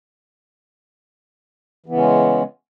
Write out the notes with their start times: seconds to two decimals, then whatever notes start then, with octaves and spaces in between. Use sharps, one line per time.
1.86 E3
1.89 B3
1.92 C#3
1.94 C#4
1.97 G#3